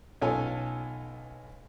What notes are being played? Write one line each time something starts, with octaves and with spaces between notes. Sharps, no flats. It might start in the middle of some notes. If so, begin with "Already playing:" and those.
B1 C#4 F4 A4 G#5